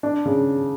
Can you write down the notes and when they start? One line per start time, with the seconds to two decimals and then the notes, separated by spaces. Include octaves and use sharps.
0.03 D4
0.26 C#3